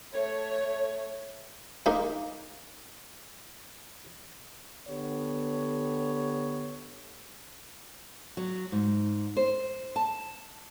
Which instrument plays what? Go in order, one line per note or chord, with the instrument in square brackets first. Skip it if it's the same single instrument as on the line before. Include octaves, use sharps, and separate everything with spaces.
[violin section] A3 C#5
[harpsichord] G#3 A#3 D#4 A#4
[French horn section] D3 B3 G4 C#5
[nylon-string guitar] F#3
G#2
C5
A5